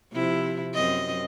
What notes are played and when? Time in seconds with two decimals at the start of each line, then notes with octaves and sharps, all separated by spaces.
0.13 C3 F3 E4
0.74 F#2 C4 D#5